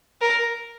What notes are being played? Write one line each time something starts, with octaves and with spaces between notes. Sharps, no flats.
A#4